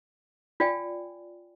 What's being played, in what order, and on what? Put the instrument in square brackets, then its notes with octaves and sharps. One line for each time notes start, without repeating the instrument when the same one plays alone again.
[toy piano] F4 D5 G5 G#5